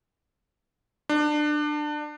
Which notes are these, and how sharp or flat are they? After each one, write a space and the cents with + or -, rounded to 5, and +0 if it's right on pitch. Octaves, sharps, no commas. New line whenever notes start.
D4 +25